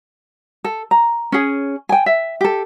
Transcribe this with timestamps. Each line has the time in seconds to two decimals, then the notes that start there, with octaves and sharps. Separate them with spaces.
0.64 A4
0.91 A#5
1.32 C#4 G#4
1.89 G5 G#5
2.06 E5
2.41 G4 A4